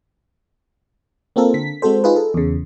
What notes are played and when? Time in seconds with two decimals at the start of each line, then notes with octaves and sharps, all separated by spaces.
1.36 A#3 C4 F4 A4 A#4
1.54 D3 B6
1.82 G#3 C4 F#4 A4 C5
2.04 D#4 F4 G#4 B4
2.16 A4
2.34 E2 C#3